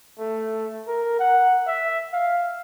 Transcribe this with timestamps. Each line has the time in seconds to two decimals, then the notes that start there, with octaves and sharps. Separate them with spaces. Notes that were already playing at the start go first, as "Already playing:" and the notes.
0.18 A3
0.88 A#4
1.19 F#5
1.67 E5
2.13 F5